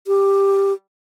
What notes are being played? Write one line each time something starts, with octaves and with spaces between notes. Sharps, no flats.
G4